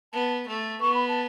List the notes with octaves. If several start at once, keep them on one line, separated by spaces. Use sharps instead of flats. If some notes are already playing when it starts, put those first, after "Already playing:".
B3 A5
A3
B3 C#6
B5
A5